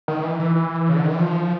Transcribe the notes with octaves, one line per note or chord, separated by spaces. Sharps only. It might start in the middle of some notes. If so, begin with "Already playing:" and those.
D#3
E3
E3
E3
C#3
D3
D#3
E3
F3